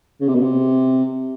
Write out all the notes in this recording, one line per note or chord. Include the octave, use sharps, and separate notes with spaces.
C#3
C3
B2
C3